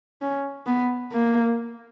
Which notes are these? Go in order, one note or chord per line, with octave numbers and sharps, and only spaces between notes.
C#4
B3
A#3